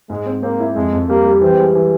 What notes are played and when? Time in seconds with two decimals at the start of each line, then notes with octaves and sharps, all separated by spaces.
0.10 G#2 G#3
0.26 C4
0.43 A#3 C4
0.60 E4
0.76 F2 G#3
0.93 F2
1.09 G3 A#3
1.25 G3
1.41 E3 C4
1.58 G#3
1.75 E3